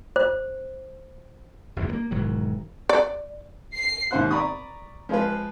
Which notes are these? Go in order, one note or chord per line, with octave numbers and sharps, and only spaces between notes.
C5
F#1 D#2 G#2 B2
G#3 A#3
E1 G#2 D#3 F#3
D5
C7
D#2 G#2 C#4 C5 F#5 F#6
D5 A#5 B5 C#6 D#6
F3 G#3 F4 B4